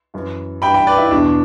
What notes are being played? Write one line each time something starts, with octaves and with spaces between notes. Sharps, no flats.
F#2 E3
G2 E3 G5 B5
G5 B5
B4 D5
E4
E2 B2 D4